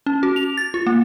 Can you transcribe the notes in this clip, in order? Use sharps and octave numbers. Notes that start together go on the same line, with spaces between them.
C#4
F#4
F7
A6
F4
A#3